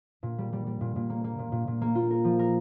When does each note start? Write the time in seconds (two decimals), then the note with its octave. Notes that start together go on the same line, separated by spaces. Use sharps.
0.23 A#2
0.38 G3
0.53 G3
0.67 G3
0.81 A#2
0.96 A#2
1.10 A#3
1.24 A#3
1.39 A#2
1.52 A#2
1.67 A#2
1.82 A#3
1.95 F4
2.11 A#4
2.24 F3
2.39 A#4